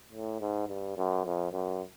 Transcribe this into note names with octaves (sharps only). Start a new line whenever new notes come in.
A2
G#2
G2
F#2
F2
F#2